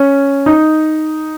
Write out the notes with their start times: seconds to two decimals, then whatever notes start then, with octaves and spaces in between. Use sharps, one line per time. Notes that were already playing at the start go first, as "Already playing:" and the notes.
Already playing: C#4
0.46 D#4